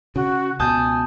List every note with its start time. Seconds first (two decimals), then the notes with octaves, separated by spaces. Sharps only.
0.16 C#3 F#4
0.59 C#2 B2 G#5 A5 D#6 G6